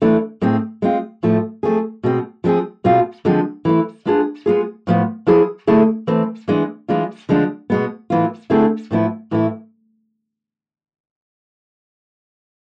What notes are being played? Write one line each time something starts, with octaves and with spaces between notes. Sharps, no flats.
E3 A3 D4
A2 G#3 C4
G#3 C4 F4
A2 F3 A3
F3 A3 C4 G#4
B2 G#3 C4
F3 G#3 C4 G#4
B2 G#3 C4 F4
D3 F3 G#3 C4
E3 A3 E4
G#3 B3 D4 F4 G#4
G#3 B3 F4 G#4
A2 F3 B3
F3 B3 E4 G#4
D3 A3 E4 G#4
E3 A3 C4
E3 G#3 B3 D4
E3 G#3 D4 F4
D3 F3 G#3 D4
B2 G#3 B3
A2 E3 B3 F4
D3 A3 C4 E4 G#4
A2 F3 B3 E4
A2 E3 A3 E4